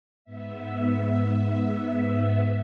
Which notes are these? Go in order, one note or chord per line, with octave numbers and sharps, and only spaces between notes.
G#2 B3 E5